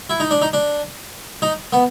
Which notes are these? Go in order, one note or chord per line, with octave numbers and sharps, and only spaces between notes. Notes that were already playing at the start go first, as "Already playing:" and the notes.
E4
D#4
D4
D#4
D4
D#4
B3